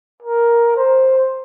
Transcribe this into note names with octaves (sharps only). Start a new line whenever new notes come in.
A#4
C5